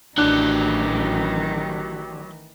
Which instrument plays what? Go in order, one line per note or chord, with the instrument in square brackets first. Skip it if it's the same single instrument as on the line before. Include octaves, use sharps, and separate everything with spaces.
[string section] A1 [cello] D#3 E3 [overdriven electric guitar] F#3 G4 [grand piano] D4 F#6